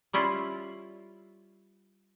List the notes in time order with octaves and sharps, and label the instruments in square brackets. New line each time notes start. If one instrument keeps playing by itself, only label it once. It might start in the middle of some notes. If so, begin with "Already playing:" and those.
[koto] G3 C#4 E4 F4